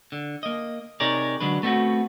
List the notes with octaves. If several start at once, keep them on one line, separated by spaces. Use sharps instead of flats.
D3
A#3 D#5
C3 D#4 G#4 A#4 C#5 D5
D3 F#3 G#3 D4 B4
A3 B3 C4 D#4 F#4